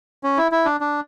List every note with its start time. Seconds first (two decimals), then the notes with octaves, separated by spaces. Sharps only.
0.23 C#4
0.38 E4
0.52 E4
0.65 D4
0.81 D4